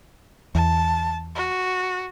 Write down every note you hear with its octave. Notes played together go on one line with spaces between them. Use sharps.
E2 A5
F#4